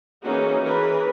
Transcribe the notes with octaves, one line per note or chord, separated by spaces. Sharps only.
E3 A#3 C#4 D#4 F#4 G#4
E3 G#4 A#4 B4